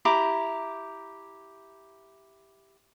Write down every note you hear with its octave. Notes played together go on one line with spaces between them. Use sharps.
E4 G4 A#5 D6